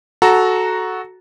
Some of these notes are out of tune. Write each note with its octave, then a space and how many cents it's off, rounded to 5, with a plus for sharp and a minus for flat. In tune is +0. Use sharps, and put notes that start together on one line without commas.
F#4 +0 A4 -15 A#5 +0